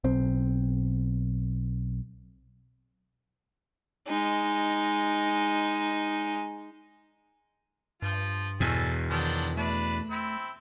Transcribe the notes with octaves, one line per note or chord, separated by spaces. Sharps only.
B1 C4
G#3 D#4
G2 F3 F4
E2 B2 A4 G#5
D#3 F3 F#3 D4
A3 D4 B4 A5
C4 E4